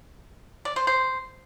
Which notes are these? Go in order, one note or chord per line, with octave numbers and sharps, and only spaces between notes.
D5
C5
C5